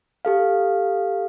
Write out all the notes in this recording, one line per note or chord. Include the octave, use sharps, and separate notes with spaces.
G4 A4 F5